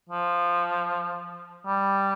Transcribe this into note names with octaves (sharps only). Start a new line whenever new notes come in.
F3
G3